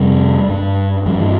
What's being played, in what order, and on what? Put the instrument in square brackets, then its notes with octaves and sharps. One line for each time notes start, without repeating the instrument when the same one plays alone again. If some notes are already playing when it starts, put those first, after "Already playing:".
Already playing: [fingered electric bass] F2 C3 G3
G2
G2 F3
E3